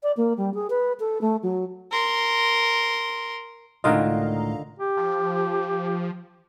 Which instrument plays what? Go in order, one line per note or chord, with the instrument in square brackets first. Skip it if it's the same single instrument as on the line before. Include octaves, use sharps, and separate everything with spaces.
[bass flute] D5
A#3
G3
G#4
B4
A4
A3
F#3
[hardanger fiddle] A#4 C6
[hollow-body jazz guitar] C#2 A2 [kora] D3 D#3 F4 [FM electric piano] D#5 F5 A#5
[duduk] G4
[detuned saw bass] F3